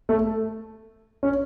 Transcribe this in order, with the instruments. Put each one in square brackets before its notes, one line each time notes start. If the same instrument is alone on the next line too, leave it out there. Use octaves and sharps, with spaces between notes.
[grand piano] A3
C#4